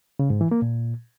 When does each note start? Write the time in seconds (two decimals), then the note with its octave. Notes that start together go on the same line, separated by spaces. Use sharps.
0.19 C#3
0.30 G#2
0.41 E3
0.51 A#3
0.62 A#2